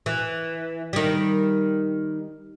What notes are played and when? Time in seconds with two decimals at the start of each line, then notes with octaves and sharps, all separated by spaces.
0.06 E3
0.93 D#3 G3